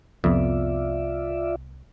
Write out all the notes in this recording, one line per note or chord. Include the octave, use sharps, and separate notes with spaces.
C2 F2 B3 F4 D5 E5